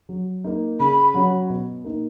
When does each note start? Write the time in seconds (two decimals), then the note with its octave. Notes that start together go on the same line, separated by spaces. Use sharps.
0.09 F#3
0.44 A#3 D#4
0.79 C#3 B5
1.14 F#3 C#4 F#4 C#5
1.50 B2
1.84 A#3 D#4